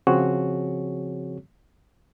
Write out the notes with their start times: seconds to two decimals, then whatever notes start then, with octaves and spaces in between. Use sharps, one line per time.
0.07 C#3 F3 C4 F#4 G#4 C#5